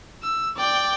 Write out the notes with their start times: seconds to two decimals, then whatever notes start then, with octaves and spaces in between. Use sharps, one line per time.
0.23 E6
0.57 D5 G5